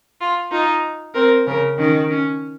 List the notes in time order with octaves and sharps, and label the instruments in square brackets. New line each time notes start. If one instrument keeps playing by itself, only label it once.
[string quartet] F4
[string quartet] D#4 [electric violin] F4
[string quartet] C4 [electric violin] A#4
[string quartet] C#3 [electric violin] A#4
[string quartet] D#3 [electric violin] C#4
[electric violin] C#4